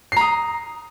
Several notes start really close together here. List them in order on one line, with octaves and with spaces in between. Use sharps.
C7 A#5 D#6